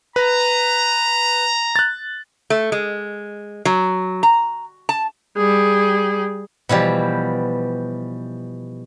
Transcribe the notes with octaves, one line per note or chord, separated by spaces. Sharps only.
B4 A#5
F#6 A6
A3
G#3
F#3
A#5
A5
G3 G#4
B2 E3 F3 G3